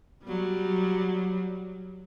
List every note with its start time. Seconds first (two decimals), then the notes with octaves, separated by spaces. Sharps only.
0.24 F#3 G3